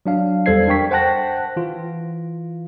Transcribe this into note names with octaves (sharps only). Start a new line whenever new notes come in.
F#3 D4 F5
E2 G3 A4 C5 G#6 C7
D4 A#4 G5 C#6 B6
C5 F#5 G5 A5 F#6 A#6
E3 F4